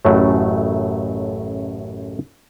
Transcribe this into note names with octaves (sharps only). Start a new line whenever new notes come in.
A1 F#2 A2 C#3 F#3 A3